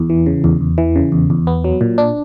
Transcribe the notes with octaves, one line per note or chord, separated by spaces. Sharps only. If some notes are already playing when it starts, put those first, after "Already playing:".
Already playing: E2
E3
C#3
E2
E2
E3
C#3
E2
E2
B3
F#3
A#2
D4